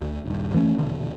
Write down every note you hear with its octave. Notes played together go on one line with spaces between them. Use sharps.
D2
D#1 G2
F2 E3 A3 C#4
D#1 B1 E2 D3